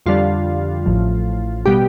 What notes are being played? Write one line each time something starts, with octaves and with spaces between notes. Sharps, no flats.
F2 D3 G3 D4 F4
A1 A2 F3
B2 G3 B3 G4